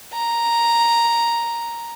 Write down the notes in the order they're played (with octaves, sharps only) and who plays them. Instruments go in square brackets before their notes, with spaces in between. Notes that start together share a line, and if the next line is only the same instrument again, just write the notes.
[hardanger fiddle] A#5